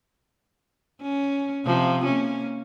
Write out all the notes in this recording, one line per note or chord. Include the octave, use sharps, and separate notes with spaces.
C#4
C3 F3
A#3 C#4